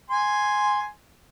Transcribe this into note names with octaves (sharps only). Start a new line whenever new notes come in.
G#5 C6